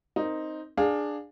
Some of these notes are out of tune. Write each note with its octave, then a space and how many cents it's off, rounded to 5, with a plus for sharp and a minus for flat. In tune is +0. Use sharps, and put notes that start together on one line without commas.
C4 +5 D#4 +0 A#4 +0
D4 +10 G#4 +0 F5 +20